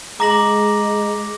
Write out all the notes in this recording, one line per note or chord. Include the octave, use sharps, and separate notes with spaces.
G#3 A#5 D6 A#6 F#7